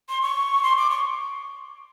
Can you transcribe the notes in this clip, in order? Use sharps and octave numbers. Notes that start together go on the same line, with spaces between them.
C6
C#6
C6
D6
C#6